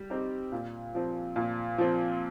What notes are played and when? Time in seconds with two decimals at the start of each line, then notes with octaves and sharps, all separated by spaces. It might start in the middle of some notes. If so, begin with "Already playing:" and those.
Already playing: G3
0.10 C4 D#4 G4
0.52 A#2
0.95 F3 C4
1.36 A#2
1.78 F3 C4